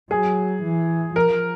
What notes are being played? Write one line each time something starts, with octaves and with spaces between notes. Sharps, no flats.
F#3 G#4
E3
F3 A#4